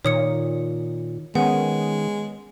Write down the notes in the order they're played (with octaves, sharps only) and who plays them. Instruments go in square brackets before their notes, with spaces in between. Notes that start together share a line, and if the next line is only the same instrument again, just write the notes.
[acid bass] A#2 [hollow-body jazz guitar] D#3 [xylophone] C#5 D#6 C#7
[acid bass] D#3 [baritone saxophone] G#3 [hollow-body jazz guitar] B3 C#4 [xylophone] F#5